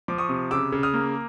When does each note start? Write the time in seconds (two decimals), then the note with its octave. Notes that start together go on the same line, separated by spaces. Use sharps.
0.08 F3 D6
0.18 C#6 D#6
0.29 C3
0.51 C#3 D6 E6
0.72 C#3
0.83 D#6 F6
0.94 A#3